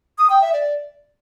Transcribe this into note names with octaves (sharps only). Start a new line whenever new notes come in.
D#6
G5
E5
D5